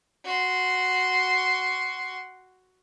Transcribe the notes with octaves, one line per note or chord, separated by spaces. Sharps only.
F#4 C6